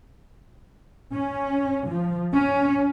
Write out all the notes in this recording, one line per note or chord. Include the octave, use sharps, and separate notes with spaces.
C#4
F3
C#4